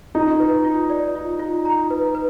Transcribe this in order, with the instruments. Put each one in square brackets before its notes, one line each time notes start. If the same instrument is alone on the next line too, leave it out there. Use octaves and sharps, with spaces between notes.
[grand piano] D#4 [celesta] F4
[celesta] B4
F4
D5
F4
F4
A#5
B4
B4